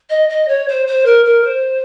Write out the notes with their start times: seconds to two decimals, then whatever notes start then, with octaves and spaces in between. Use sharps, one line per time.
0.10 D#5
0.29 D#5
0.48 C#5
0.68 C5
0.87 C5
1.05 A#4
1.25 A#4
1.44 C5